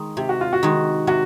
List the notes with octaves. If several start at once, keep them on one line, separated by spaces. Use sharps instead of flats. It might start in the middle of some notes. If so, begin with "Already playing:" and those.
Already playing: D#3 G#3
C3 G4
F#4
F4
F#4
D#3 G#3
C3 F#4